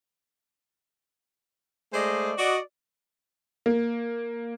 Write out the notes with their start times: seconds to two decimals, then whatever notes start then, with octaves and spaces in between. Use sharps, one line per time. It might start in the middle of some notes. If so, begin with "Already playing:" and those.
1.94 G#3 A3 C5 D5 D#5
2.38 F#4 D5 D#5
3.66 A#3